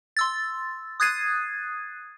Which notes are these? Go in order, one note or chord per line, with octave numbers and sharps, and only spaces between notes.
C6 E6 A6
D#6 F#6 G#6 A6 C7 D#7